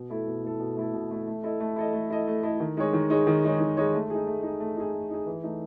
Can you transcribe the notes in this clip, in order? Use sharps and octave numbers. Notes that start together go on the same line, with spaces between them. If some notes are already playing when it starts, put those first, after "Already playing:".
Already playing: B2
A3 E4 A4
B2
A3 E4 A4
B2
A3 E4 A4
B2
A3 E4 A4
A3
E4 A4 D#5
A3
E4 A4 D#5
A3
E4 A4 D#5
A3
E4 A4 D#5
D#3
G#3 D#4 G#4 C#5
D#3
G#3 D#4 G#4 C#5
D#3
G#3 D#4 G#4 C#5
D#3
G#3 D#4 G#4 C#5
A3
D#4 G#4
A3
D#4 G#4
A3
D#4 G#4
A3
D#4 G#4
E3
A3 D#4